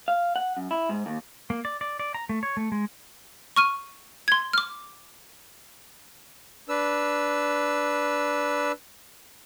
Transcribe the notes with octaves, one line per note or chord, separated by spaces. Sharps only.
F5
F#5
F#2
E4
G#2
D#2
A#3
D5
D5
D5
A#5
A3
C#5
A3
G#3
C#6 F6 D#7
C6 G#6
D6 F6
D4 B4 E6